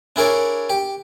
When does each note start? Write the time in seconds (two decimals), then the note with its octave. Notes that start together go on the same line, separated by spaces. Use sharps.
0.16 D4 E4 G#4 A#4 C#5 D5
0.70 G4